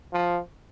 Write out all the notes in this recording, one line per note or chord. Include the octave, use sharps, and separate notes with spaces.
F3